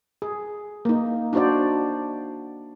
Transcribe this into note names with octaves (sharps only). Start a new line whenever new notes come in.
G#4
A#3 D#4
D4 D#4 F#4 C5 D5